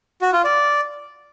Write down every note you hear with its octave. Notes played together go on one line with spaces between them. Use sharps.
F#4
F4
D5